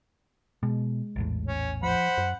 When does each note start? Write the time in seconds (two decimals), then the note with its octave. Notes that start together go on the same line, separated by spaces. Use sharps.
0.63 B2 G#3
1.16 A#1 E2 A2
1.47 C#4
1.83 F3 C5 F#5 B5
2.18 F#2